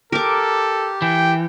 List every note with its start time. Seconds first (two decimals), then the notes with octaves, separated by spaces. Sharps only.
0.12 G4 A4 A#4 D6
1.02 E3 G5